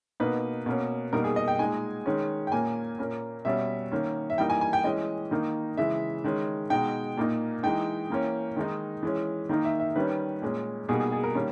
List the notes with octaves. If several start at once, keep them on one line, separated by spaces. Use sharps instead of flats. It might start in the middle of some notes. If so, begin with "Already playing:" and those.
B2 A#3 D#4 B4
B2 A#3 C#4
B2 G3 A#3 D#4 A#4
G#4
D#5
G5
A#2 G#3 D#4 G#5
D#3 G#3 C#4
G5
A#2 A#3 C#4 G#5
A#2 A#3 C#4
B2 G3 C#4 E5
D#3 A#3 C#4
E5
E3 G3 A#3 D#4 G5
G#5
G#5
G5
E3 G#3 C#4 D#5
D#3 A#3 D#4
C#3 E3 G#3 E5
D#3 G#3 C#4
B2 G#3 D#4 G5
A#2 A#3 D#4
E3 G#3 D#4 G5
E3 A#3 C#4
D#3 G#3 D#4
E3 G#3 C#4
D#3 A#3 D#4
E5
E5
D#3 G3 C#4 B4
A#2 G#3 C#4
B2 G3 A#3 D#4 G#4
G#4
G#4
A#4
D#3 G3 A#3 C#4